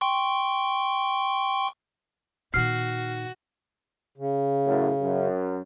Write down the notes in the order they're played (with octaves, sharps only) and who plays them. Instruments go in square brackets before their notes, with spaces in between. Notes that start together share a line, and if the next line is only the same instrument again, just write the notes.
[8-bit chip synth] G5 C6 C#6
[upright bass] A#2 D#3 [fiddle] F#4 [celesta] F6 C7
[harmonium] C#3
[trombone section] F#2 A2
F#2